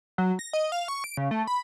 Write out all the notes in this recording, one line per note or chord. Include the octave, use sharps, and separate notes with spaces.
F#3
A#6
D#5
F5
C#6
D7
C#3
A3
B5